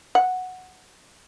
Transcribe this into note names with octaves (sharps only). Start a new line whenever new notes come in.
F#5